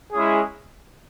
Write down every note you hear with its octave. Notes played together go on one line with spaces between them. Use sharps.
G#3 C#4 E4 G#4